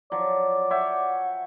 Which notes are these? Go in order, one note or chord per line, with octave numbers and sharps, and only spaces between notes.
F3 F#3 D5
C#5 E5 F#5 G5